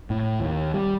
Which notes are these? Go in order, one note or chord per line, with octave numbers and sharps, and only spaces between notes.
A2
D#2
G3